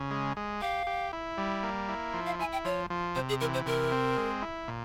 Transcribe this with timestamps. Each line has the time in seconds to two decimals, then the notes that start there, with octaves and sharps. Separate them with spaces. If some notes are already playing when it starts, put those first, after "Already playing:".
Already playing: C#3
0.11 G#3
0.37 G#3
0.61 G4 F5
0.87 G4
1.13 E4
1.37 G3
1.63 A#3
1.89 E4
2.13 F3
2.26 F5
2.39 E4 G#5
2.52 G5
2.65 F3 C#5
2.90 F3
3.15 C3 C5
3.29 G#4
3.41 E3 A#4
3.54 C5
3.66 C3 A#4
3.92 C4
4.17 G#3
4.42 E4
4.68 A#2